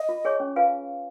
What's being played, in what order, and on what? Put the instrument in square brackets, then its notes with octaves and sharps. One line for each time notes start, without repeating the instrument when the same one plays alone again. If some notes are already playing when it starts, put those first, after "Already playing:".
Already playing: [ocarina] D#5
[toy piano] F4
G#4 C#5 G#5 C#6
C#4
F4 B4 F5 G#5